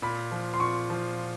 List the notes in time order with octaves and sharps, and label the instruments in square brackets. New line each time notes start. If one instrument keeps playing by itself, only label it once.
[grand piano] A#2 B5
F3
C6
A#2 C#6
F3